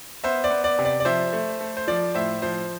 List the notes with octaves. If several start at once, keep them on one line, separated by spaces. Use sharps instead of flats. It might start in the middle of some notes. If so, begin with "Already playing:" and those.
B3 C5 E5
D5
B3
D5
C3
D5
D5
F3 C5 E5
A3
A3
C5
F3 D5
A2 C5 E5
F3 C5